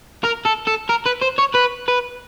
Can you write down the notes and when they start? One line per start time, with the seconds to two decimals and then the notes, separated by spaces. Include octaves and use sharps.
0.24 A#4
0.45 A4
0.67 A4
0.89 A#4
1.06 B4
1.22 C5
1.38 C#5
1.54 B4
1.88 B4